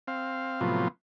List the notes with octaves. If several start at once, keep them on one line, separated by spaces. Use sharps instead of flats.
C4 F5
A2 C3 F3 F#3 B3 F4